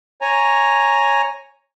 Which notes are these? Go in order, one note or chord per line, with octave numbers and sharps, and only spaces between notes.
C#5 G#5 A#5